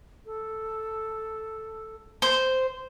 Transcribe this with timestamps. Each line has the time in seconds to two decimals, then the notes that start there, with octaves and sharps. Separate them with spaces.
0.26 A4
2.22 C5